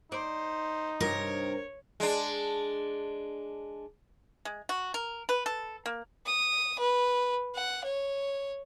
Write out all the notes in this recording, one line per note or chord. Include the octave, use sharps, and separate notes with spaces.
D#4 C5 D5
G2 C3 A#4 C#5
G#3 D4
G#3
F#4
A#4
B4
A4
A#3
D#6
B4
F#5
C#5